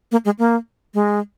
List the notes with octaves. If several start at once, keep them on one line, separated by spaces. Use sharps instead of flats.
A#3
G#3
A#3
G#3